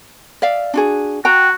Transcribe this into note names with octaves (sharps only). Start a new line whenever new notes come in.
D5 E5 F5
D4 F#4 G#4
F#4 G5 A#5